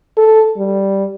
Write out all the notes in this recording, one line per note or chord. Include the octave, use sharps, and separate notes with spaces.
A4
G3